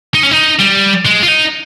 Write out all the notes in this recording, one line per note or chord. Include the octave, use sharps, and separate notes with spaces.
D#4
C#4
D#4
G3
G#3
F4
D#4